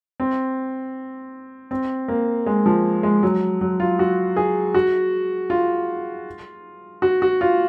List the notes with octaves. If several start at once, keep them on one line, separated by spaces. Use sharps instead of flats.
C4
C4
A#3
G#3
F3
G#3
F#3
F#3
F4
F#4
G#4
F#4
F4
F#4
F#4
F4